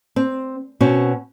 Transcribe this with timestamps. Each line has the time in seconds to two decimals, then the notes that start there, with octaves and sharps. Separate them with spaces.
0.16 C4
0.81 B2 C4 C#4 F#4